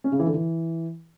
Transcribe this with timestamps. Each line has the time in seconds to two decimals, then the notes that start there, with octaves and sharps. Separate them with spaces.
0.04 C#4
0.12 C#3
0.19 E3
0.27 D3
0.35 E3